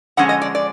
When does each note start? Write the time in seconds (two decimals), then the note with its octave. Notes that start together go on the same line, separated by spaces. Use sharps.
0.17 D3 F3 G#3 C#4 F#5
0.29 D#5
0.42 D5
0.55 D5